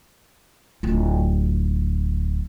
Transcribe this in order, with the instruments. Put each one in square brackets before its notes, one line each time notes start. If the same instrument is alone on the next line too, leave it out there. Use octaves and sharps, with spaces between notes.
[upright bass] D1 F4